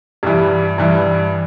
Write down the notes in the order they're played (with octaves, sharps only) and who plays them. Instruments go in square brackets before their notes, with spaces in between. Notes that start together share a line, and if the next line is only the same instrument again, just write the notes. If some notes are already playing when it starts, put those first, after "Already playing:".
[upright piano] G2 E3 G3
G2 E3